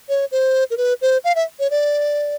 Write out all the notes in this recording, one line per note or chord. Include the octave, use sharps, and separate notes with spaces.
C#5
C5
A#4
B4
C5
F5
E5
C#5
D5